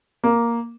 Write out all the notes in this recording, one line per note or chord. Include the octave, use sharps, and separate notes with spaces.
A#3